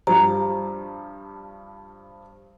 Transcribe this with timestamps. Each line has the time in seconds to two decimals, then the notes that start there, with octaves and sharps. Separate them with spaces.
0.07 G2 F3 G3 A#5